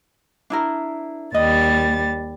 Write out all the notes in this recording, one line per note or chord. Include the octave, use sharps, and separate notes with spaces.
D4 E4 A#4
D#2 G3 D#5 A6